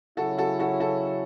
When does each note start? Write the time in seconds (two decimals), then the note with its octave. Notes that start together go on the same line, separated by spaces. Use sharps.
0.17 C#3 F#3 C#4 E4 F#4 A4
0.38 F#4 A4
0.59 F#4 A4
0.80 F#4 A4